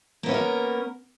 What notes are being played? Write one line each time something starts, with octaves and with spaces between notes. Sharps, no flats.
A#3 B3 C#4 E4 A#4